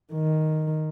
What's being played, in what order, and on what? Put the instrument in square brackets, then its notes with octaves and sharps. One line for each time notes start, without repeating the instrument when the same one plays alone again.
[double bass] D#3